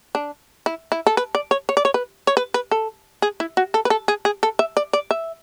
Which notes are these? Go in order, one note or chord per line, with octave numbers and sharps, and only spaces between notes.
D4
E4
E4
A4
B4
D5
C#5
C#5
D5
C#5
B4
C#5
B4
B4
A4
G#4
E4
F#4
A4
B4
A4
G#4
G#4
A4
E5
D5
D5
E5